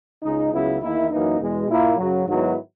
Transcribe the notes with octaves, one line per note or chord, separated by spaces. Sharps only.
C#2 C#3 G#3 D#4
C#2 C#3 F#3 B3 E4
E2 D#3 A#3 E4
F#2 E3 A#3 D#4
E2 B2 G#3
A#2 A#3 E4
F#2 C#3 F#3
G#2 D#3 F#3 B3 E4